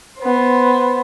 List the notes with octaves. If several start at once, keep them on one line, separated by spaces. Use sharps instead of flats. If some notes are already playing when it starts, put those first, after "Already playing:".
B3 C5